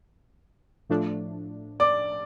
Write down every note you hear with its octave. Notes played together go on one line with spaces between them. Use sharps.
A2 F3 A3 D4
D5 D6